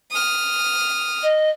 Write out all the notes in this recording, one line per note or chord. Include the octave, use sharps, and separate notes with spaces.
D#6 F6
D#5